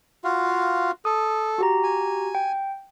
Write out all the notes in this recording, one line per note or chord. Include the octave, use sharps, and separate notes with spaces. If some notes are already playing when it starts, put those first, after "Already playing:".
F4 F#4 F5
A4 D#6
F#4 G4 A#5
G#5
G5